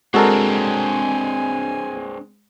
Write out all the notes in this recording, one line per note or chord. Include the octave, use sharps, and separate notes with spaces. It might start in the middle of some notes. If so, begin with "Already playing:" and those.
G#3 C4 D4 F#4 A4 A#4 G#5